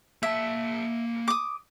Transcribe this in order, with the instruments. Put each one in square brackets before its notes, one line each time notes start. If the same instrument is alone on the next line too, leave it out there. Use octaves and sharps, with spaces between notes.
[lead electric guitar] A#3 A5 [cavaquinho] E5
[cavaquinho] D6 D#6